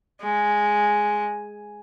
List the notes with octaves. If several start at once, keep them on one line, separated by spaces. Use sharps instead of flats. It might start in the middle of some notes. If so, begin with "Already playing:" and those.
G#3